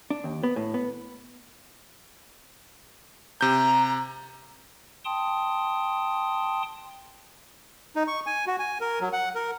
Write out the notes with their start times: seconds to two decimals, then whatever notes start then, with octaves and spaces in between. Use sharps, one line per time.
0.10 D4
0.24 D#2
0.43 B3
0.56 A2
0.74 B3
3.41 C3 A#5 G6
5.05 G5 A5 C6 D#6
7.96 D#4
8.08 C#6
8.26 G#5
8.47 F#4
8.59 G#5
8.81 A#4
9.01 F#3
9.13 F#5
9.35 A#4